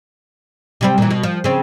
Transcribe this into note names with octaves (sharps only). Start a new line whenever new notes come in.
C3 G3 C4
A#2 E3
B2
F3
C#3 C4